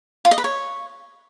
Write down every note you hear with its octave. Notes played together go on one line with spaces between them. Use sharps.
F4
D#5
B4
C#5